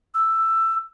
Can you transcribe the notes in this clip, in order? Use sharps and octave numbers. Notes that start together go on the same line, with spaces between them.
E6